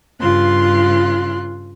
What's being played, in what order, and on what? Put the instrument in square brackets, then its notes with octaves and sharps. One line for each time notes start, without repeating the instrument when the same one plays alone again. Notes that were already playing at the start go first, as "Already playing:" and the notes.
[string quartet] G2 C#3 F4 C6 F#6